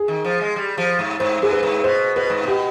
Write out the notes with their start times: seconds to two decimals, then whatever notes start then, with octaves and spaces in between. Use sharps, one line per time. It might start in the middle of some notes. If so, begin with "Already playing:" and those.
Already playing: G#4
0.08 D#3
0.24 F3
0.41 G#3
0.56 G3
0.78 F3
0.99 G#2
1.20 G#2 C5
1.42 G2 G#4
1.52 B4
1.63 G#2
1.84 B2 C5
2.16 B2 B4
2.30 G#2
2.44 B2 G4